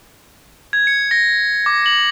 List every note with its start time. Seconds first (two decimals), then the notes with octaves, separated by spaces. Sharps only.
0.73 G#6
0.87 C#7
1.11 A#6
1.66 D6
1.86 F#7